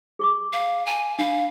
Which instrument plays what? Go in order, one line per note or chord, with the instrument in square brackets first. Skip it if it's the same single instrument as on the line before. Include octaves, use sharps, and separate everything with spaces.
[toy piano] G#4 C#6 D6
[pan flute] F5
G#5
[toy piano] D4 B5 [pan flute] F5